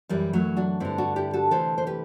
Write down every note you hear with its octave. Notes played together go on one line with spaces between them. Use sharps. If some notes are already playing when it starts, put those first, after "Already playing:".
F#2 E3 G3
F#3 A3
D4 F#4
G2 D3 C4 E4
D4 F#4
E4 G4
F#4 A4
D2 C3 E3 A4 C5
C5
G4 B4